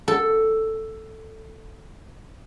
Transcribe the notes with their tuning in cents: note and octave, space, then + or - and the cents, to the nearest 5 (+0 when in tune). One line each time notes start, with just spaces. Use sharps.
A4 +5